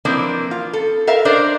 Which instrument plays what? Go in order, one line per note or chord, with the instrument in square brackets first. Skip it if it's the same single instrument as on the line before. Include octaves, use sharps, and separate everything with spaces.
[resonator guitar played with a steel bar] E3 F3 A#3 C4 D4
F4
A4
A#4 E5 F5
D4 A#4 C5 D5